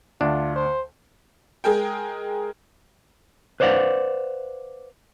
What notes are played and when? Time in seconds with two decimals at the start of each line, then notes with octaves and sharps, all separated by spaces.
0.21 D2 D4 F4
0.56 C5
1.64 G#3 G#4 A#4 G5
3.60 B4 C5 D5 F5 F#5